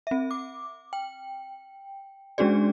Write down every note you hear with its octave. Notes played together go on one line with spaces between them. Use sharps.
C4 E5
D6
G5
G#3 C#4 D4 F#4 G#4 D5